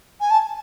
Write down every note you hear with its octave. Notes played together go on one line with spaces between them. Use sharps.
G#5
A5